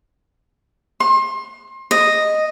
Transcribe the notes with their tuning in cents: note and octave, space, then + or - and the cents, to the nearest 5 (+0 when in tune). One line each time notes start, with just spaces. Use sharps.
C6 +30
D#5 -5